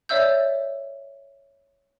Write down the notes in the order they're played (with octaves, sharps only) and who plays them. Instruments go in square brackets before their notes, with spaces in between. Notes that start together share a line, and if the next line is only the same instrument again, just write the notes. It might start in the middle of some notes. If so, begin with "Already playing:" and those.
[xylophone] C#5 D5 E5 E6 G6